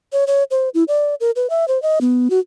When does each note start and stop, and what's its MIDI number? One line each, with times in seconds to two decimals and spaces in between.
0.12 0.24 73
0.27 0.44 73
0.51 0.69 72
0.74 0.84 64
0.88 1.15 74
1.20 1.31 70
1.36 1.49 71
1.50 1.67 76
1.68 1.81 72
1.82 1.99 75
2.01 2.28 59
2.30 2.39 66